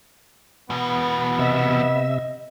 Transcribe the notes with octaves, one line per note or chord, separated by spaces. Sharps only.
E2 B2 B3
C3 D#5 E5